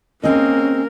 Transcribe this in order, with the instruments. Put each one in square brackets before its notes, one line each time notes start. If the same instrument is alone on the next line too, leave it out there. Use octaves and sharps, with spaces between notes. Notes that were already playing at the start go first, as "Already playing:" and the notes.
[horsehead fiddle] A#3 A#4 [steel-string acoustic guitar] C4 G#4 D#5 [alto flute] C#4